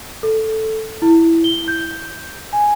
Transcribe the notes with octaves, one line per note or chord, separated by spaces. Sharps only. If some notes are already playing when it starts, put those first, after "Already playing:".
A4
E4
G7
G6
G#5